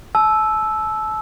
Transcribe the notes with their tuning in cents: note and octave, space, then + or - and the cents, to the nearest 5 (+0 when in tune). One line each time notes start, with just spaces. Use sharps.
A5 -35 E6 +0